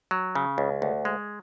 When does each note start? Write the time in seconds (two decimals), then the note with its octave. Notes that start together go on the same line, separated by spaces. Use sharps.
0.11 F#3
0.35 C#3
0.58 C#2
0.82 D2
1.05 G#3